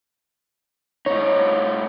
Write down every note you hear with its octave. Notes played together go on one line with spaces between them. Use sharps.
A2 D#4 C#5